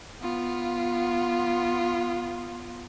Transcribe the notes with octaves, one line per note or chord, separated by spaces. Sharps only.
B3 F4